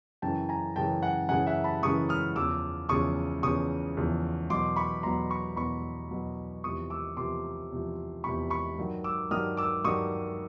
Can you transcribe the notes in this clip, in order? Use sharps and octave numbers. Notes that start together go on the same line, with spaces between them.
F#2 C#3 E3 G5 A5
G#5 A#5
F#2 C#3 E3 G5 A5
F#5 G#5
F#2 C#3 E3 F#5 G#5
E5 F#5
A5 B5
F#2 C#3 E3 C#6 D#6
D#6 F6
E2 C#3 F3 D6 E6
E2 C#3 F3 C#6 D#6
E2 C#3 F3 C#6 D#6
E2 C#3 F3
E2 B2 F#3 C6 D6
B5 C#6
E2 B2 F#3 A#5 C6
B5 C#6
E2 B2 F#3 B5 C#6
E2 B2 F#3
E2 C3 F3 C#6 D#6
D6 E6
E2 C3 F3 C6 D6
E2 C3 F3
E2 C3 F3 B5 C#6
B5 C#6
G2 D#3 F#3
D6 E6
G2 D#3 F#3 D#6 F6
D6 E6
G2 D#3 F#3 C#6 D#6